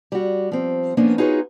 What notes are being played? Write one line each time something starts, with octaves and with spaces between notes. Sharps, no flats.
G3 F#4
F3 C4
F3 A#3 B3 C#4 D4
D#4 F4 F#4 G#4 B4 C#5